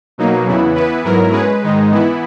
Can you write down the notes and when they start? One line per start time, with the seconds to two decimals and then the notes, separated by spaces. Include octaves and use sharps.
0.18 B2 F#3 A#3 D#4
0.47 E2 C#3 E3 B3 E4
0.75 E3 B3 E4 B4
1.04 G#2 F#3 B3 E4 A#4
1.32 G#3 C#4 G#4 B4
1.61 G#2 D#3 G#3 D#4
1.91 E3 B3 E4